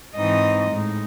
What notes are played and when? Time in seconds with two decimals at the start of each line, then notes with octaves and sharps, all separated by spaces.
0.14 G#2 E3 C4 D#4 D#5
0.69 A2 G#3 D#4